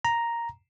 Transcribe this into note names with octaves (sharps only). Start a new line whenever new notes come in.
A#5